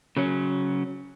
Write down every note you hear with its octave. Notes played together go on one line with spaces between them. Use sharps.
C#3 F#3 C#4